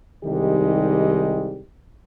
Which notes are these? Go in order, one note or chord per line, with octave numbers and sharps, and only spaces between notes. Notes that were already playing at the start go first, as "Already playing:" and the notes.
C2 D#3 G3 G#3 D#4 G4